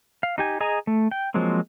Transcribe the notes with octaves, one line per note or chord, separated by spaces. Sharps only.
F5
D#4 G4 G#5
G#4 D#5 G#5 A#5
A3
G5
F3 F#3 G#3 A#3 C4